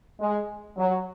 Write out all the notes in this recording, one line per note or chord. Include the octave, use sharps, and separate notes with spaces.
G#3
F#3